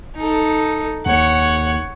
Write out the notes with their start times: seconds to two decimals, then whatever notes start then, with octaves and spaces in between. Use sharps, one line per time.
0.16 D#4 A4
1.06 D#2 C#5 F#5